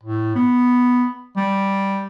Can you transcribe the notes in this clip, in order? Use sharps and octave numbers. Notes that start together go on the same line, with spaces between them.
A2
B3
G3